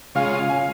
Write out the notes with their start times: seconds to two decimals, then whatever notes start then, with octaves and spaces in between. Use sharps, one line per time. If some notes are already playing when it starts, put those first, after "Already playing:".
0.15 C#3 G#3 F4 F5
0.32 F5
0.49 G#5